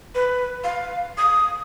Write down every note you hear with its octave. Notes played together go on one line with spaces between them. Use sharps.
B4
F5
D#6